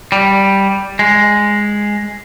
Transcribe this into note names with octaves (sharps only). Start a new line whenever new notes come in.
G3
G#3